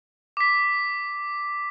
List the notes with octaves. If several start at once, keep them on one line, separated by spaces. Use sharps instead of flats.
D6 B6